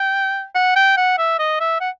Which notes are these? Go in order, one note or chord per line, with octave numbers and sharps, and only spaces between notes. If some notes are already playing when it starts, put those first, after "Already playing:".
Already playing: G5
F#5
G5
F#5
E5
D#5
E5
F#5